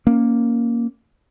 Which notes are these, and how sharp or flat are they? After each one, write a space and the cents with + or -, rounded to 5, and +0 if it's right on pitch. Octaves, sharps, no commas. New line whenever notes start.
A#3 +0 C#4 +0